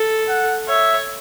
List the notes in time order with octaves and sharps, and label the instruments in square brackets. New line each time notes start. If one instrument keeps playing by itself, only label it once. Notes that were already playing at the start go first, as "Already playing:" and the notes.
Already playing: [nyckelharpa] A4
[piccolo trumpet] F#5
[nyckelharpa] C#5 [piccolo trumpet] E5